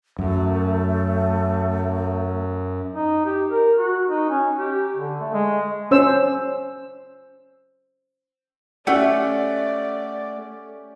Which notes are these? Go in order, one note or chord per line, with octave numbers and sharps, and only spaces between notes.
F#2 A3
D#4
G4
A#4
F#4
D#4
C#4
G4
D3
A3
G#3
C#4 C5 E6
A3 C#4 G4 D5 F#5